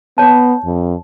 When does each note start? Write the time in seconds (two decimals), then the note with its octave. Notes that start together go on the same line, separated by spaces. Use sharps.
0.18 B3 C#5 A5
0.65 F2